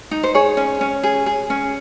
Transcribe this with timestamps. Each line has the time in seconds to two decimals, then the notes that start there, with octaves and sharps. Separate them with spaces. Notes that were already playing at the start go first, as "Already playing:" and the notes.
0.11 D#4
0.23 C5
0.35 G#4 C#5
0.57 C#4
0.81 C#4
1.03 G#4
1.26 G#4
1.50 C#4